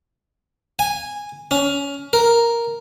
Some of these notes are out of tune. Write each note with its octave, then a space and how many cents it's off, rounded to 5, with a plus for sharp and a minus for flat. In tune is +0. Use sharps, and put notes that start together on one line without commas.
G#5 -10
C#4 +20
A#4 +0